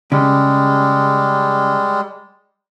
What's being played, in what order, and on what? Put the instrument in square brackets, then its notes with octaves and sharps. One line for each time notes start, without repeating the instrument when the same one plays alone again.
[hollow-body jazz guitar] C#3 [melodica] G3 G#3